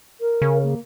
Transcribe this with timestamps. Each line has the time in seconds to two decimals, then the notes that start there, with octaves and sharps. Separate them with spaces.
0.20 A#4
0.42 C#3
0.63 A#3